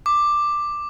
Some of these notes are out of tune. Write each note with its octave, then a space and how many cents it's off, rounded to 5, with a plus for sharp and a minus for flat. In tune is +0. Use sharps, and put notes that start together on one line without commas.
D6 +10